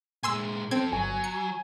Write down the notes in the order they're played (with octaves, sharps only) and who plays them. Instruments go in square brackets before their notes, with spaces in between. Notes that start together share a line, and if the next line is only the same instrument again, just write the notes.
[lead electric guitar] A#2 G#3 [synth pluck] G#5 C6 E6
[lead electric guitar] F3 A4 [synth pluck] C4 G#6
[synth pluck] G1 [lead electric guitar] F#3 [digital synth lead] G#5
[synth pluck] C#7